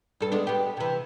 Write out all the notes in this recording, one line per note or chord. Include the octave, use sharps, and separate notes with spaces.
G2 A4
G#3 B3 D4
B3 G4
C3 E3